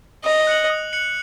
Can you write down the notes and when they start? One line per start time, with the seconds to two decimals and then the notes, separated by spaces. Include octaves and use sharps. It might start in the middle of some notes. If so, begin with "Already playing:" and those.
0.24 D#5 D#6
0.47 F#6 C#7 F#7
0.70 D#6
0.93 F#6 C#7 F#7